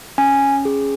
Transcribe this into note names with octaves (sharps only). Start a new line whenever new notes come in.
C#4 G#5
G#4